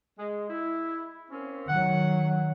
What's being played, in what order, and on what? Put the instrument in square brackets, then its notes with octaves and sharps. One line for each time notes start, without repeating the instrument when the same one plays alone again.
[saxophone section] G#3
E4
A#3 C4 C#4
[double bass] D#3 F#3 [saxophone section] F#5